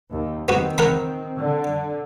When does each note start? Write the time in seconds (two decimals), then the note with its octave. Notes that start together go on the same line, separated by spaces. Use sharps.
0.11 D#2
0.48 D#3 B3 C4 F#4
0.78 A#4 F#5 B5
1.37 D3